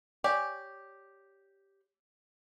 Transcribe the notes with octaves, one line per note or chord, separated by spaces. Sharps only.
G4 C#5 D5 G#5